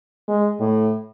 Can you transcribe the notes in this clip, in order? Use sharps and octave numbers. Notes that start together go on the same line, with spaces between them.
G#3
A2